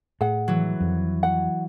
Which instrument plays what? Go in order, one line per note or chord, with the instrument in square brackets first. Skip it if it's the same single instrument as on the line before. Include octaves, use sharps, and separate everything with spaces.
[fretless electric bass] A2 [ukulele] G#4 F#5
[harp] E3 F#3
[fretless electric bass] F2
[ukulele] F#5